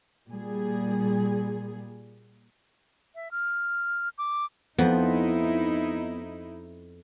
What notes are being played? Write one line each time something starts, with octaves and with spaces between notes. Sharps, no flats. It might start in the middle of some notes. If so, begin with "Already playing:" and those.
A#2 G3 G#4
E5
F6
D6
F2 F3 B3 D#4 E4